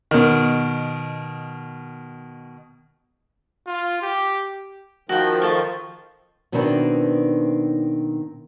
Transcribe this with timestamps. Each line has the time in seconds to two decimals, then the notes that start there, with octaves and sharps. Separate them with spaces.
0.11 B2 D#3
3.67 F4
4.02 G4
5.09 D#3 F3 F#4 G5
5.42 F4 A4 C#6
6.52 B2 D#3 B3 C4 D4 E4